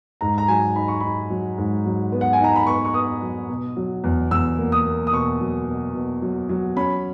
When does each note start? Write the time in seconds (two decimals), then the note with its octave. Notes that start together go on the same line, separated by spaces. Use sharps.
0.21 G#2 A#5
0.38 A#5
0.48 F#3 G#5
0.75 D#4 B5
0.88 C#6
1.00 D#4 B5
1.30 F#3
1.58 G#2
1.86 F#3
2.12 B3
2.21 F#5
2.33 G#5
2.40 D#4 A#5
2.56 B5
2.67 B3 C#6
2.85 C#6
2.94 B3 D#6
3.22 F#3
3.49 B2
3.77 F#3
4.04 E2
4.31 E2 E6
4.58 A#3
4.72 D#6
4.86 A#3
5.07 D#6
5.12 B2 C#6
5.40 F#3
5.68 B2
5.95 B2
6.22 F#3
6.49 F#3
6.76 C#4 B5